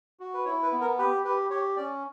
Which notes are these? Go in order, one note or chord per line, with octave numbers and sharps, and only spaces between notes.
F#4
B4
E4 C#5
B4
B3
A#4
G4 B4
G4 B4
G4 C#5
C#4 D5